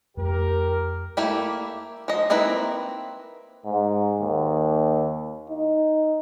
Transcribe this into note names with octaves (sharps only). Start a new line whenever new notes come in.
F2 A3 G4 A#4
A3 A#3 E4 G4
F3 D#5
A#3 C4 D#4 E4 B4
G#2
D#2
D#4